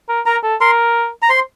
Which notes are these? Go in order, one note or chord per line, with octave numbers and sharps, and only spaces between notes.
A#4
A#4 A#5
A4
A#4 C6
A#5
C5 C6